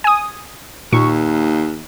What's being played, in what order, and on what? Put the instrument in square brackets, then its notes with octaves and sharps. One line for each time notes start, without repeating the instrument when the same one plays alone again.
[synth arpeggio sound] G#5 D#6
[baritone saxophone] D#2 [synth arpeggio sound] A#2 C#6